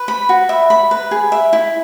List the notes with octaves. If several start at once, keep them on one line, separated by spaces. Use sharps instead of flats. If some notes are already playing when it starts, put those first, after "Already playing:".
Already playing: B4
B5
F#4
E5
B5
B4
G#4
E5
E4